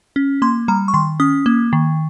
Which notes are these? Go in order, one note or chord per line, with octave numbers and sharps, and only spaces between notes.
C#4
A#3 C6
G3 A#5
C#6
D#3 C6
C#4 D#6
A#3
D#3